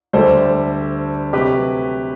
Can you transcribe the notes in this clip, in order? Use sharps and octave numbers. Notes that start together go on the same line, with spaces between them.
D2 D3 G3 D4 A4 C5
C3 F#3 A3 G4 B4